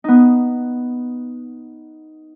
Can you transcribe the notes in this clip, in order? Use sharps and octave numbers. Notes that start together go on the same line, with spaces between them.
B3 D#4